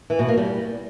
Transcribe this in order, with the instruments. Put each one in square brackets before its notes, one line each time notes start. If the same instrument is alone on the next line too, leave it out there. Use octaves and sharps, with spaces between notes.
[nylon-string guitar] E3
B2
A#3
G3